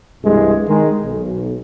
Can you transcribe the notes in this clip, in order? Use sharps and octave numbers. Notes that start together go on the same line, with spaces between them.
C2 G2 B2 E3 G#3
D#3 G#3
B1